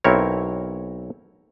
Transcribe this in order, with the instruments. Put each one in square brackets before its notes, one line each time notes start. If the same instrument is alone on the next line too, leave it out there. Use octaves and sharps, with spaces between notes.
[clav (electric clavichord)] B1 C4 E4 A#4 C#5